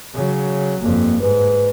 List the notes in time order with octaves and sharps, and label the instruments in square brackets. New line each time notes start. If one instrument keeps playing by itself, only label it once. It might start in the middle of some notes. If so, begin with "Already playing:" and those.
[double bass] C#3 F#3
[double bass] G1 F2 [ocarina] A#3
[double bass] G#2 [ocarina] B4